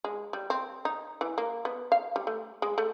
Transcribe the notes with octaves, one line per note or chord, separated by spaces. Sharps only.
G#3
G3
C4
D#4
E3
A#3
B3
F5
G3
A3
G#3
A3